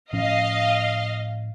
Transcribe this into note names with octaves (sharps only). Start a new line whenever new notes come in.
A2 F3 C#4 D#5 F5